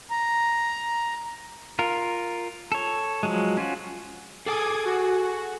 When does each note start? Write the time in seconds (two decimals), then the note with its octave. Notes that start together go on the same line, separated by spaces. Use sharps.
0.11 A#5
1.79 F4 A#4
2.72 A4 C#5
3.23 F3 F#3 G#3
3.57 C#4 F4 F#4
4.46 G#4 A4 G#5 D6 D#6 G#6
4.85 F#4